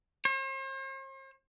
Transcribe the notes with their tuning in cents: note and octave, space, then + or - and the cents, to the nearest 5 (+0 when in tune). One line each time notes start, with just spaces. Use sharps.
C5 +45